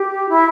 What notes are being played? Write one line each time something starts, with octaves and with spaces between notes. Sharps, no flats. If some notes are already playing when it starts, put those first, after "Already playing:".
Already playing: G4
E4